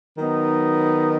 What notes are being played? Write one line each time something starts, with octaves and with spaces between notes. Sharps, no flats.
D#3 F#3 B3 D#4